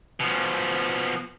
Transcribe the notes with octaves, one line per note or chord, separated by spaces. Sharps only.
B2 F3